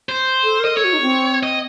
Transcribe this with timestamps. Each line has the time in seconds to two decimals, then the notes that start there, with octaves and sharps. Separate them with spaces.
0.09 C5
0.44 A4
0.60 A#4
0.65 D#5
0.77 A4 C#5
0.84 F#4
0.93 D#4
1.01 C4
1.43 D#5